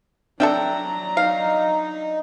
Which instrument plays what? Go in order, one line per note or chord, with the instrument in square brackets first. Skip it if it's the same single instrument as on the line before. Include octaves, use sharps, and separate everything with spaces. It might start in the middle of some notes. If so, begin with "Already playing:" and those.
[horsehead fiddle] F#3 A#5 [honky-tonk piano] D4 [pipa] A4 E5 G5
[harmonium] D#4 [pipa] F5